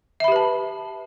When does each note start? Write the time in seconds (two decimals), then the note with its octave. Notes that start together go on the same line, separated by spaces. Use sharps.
0.20 E5
0.24 B5
0.28 G4
0.32 B4
0.36 A5